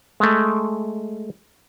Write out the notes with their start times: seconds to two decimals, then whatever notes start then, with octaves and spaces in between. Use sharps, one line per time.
0.20 G#3 A3